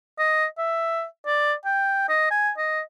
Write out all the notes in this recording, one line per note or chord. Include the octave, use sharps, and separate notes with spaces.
D#5
E5
D5
G5
D#5
G#5
D#5